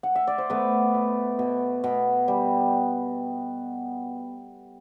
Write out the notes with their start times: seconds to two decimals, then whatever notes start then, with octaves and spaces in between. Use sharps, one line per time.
0.03 F#5
0.16 E5
0.27 D5
0.38 C5
0.50 A3 B3 B4
0.95 B2
1.39 B2
1.84 B2
2.28 G3